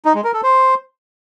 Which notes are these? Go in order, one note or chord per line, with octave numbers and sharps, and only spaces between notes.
D#4
G#3
A#4
A4
C5